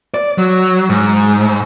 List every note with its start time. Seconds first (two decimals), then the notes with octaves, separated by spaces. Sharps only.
0.14 D5
0.38 F#3
0.89 G#2